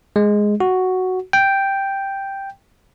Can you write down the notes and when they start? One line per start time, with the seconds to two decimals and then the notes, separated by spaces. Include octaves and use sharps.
0.16 G#3
0.60 F#4
1.33 G5